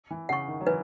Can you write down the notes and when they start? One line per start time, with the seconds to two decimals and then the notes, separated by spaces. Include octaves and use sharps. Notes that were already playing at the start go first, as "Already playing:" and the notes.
0.11 E3
0.29 C#3 F#5
0.33 C#6
0.48 D#3
0.61 F#3
0.67 E3 B4